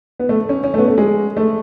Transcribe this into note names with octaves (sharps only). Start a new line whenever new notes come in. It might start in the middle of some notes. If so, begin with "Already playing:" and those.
B3
A3
C#4
C#4
A3
B3
A3
G#3
A3